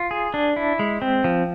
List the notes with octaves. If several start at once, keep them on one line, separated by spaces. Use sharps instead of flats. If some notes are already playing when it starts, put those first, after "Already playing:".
Already playing: F4
G#4
D4
E4
G#3
C4
F3